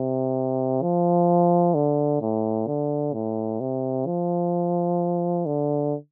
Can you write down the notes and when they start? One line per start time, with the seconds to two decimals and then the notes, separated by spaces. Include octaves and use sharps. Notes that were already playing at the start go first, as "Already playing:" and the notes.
Already playing: C3
0.82 F3
1.75 D3
2.21 A2
2.67 D3
3.13 A2
3.60 C3
4.06 F3
5.46 D3